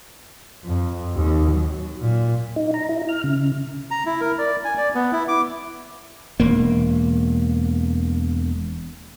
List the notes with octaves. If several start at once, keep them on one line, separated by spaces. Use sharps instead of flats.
F2
D#2
F#3
A#2
D#4
A#5
E4
F6
C#3
A#5
E4
A#4
D5
G#5
D5
B3
E4
D6
E1 A#3